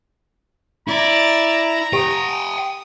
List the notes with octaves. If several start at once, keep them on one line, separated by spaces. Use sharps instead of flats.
E4 D5 A#5
G4 F#5 G5 D#6